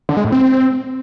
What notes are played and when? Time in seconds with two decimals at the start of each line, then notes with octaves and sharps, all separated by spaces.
0.09 D3
0.17 G#3
0.25 A2
0.32 C4